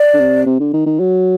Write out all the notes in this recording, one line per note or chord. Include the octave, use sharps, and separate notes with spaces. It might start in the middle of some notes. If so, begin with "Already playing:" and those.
Already playing: D5
D3
C3
C3
D3
D#3
D#3
F#3